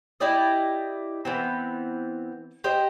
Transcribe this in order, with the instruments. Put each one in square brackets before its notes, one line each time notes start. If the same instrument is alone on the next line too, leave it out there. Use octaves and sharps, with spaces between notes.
[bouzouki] E4 G4 D5 D#5
E3 B3 C4
G4 C5 D#5